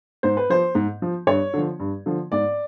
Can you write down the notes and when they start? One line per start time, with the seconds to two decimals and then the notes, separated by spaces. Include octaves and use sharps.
0.23 G#2 C5
0.37 B4
0.50 F3 C5
0.75 G#2
1.02 F3
1.27 G2 C#5
1.54 D3 F3
1.80 G2
2.06 D3 F3
2.32 G#2 D5